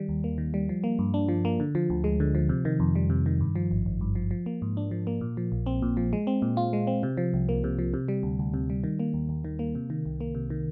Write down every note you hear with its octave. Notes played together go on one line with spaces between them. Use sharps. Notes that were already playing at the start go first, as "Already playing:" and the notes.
Already playing: D#3 G3
D#2
A#3
D#3
G3
F3
A#3
G2
D4
F3
A#3
D3
F3
D2
G#3
D3
F3
C3
D#3
F2
G3
C3
D#3
G2
F3
G#1
G#1
G2
F3
F3
A#3
G#2
D4
F3
A#3
A#2
F3
A#1
C4
A#2
F3
G#3
C4
A#2
F4
G#3
C4
C3
F3
C2
A#3
C3
F3
C3
G3
D2
D2
C3
G3
D#3
A#3
D#2
D#2
D#3
A#3
C3
D#3
C2
A#3
C3
D#3